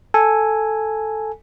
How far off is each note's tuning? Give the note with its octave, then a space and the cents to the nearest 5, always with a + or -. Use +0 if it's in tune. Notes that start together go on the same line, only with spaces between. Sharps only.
A4 +0 G#5 +0